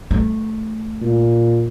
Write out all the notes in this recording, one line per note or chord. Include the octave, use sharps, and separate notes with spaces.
A3
A#2